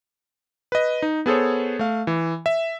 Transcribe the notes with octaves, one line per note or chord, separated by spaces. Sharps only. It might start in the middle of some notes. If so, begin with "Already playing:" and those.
B4 D#5
D#4
B3 G#4 A4 C5 C#5
A3 F5
E3
E5